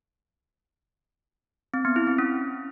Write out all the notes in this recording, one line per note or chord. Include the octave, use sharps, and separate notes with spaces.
C4
B3
E4
C4
C#4